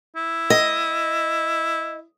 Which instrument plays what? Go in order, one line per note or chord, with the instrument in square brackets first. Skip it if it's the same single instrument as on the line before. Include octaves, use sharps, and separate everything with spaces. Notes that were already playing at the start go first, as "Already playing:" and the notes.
[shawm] E4
[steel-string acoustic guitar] D#5